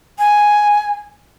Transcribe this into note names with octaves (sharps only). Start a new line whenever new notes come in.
G#5